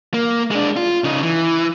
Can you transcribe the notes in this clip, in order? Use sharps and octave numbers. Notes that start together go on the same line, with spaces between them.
A#3
G#3 D4
F4
C#3 D#4
E3